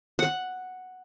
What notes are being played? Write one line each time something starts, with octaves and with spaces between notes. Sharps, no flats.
F#5